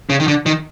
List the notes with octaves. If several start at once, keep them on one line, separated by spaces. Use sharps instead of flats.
C#3
D#3
D3
D#3